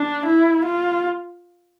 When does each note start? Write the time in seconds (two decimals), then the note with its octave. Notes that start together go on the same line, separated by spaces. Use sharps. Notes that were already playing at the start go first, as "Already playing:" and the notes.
Already playing: D4
0.25 E4
0.65 F4